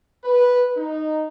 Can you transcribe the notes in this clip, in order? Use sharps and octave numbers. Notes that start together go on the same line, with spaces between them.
B4
D#4